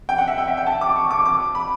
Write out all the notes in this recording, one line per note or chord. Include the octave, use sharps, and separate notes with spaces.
G5
F#5
E5
G5
E5
G5
A5
D6
C#6
D6
D6
B5